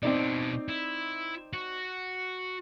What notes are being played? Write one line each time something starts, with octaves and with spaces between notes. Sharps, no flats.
B2 C4 D4 D#4 D5
E4
F#4